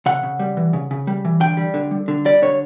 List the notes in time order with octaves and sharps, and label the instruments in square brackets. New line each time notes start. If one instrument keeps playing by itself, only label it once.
[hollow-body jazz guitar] C#3 F#5
C#3
G3
E3
C#3
C#3
G3
E3
D3 G5
G3
D3
G3
D3
G3 D5
D3 C#5